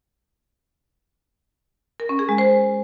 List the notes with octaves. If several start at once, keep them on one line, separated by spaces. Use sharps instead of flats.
A#4
C#4
G#4
G#3
C5